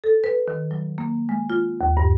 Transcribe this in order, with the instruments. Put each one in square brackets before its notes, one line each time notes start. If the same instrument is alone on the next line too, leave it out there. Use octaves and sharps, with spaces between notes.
[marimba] A4
B4
D#3
F#3
A#3
G#3
F4
D#2
G2